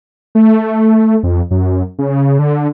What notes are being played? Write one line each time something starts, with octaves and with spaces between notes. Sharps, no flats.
A3
F2
F#2
C#3
D3